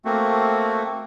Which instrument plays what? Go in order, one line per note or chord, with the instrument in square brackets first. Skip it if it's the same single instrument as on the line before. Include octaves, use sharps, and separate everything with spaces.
[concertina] A3 A#3 C4 F#4